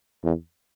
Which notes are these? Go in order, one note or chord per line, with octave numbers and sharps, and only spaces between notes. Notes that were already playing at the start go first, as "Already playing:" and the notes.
E2